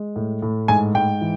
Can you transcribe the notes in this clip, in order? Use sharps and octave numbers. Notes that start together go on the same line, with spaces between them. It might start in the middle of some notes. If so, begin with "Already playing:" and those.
Already playing: G#3
A2
A2
G#2 G#5
G#2 G5
E3